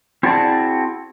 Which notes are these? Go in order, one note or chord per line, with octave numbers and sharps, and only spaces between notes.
C4 E4 F#4 G#4 D5 A5